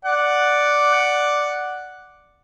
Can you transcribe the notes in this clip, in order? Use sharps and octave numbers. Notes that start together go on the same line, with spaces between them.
D5 F#5